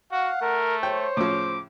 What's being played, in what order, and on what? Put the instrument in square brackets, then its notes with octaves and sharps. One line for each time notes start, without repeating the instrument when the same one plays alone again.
[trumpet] F#4 [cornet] F5 [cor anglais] F#5
[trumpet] A3 [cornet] A#4
[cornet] C5 [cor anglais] C#5 [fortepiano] G5
[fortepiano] A2 C#3 F3 [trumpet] D6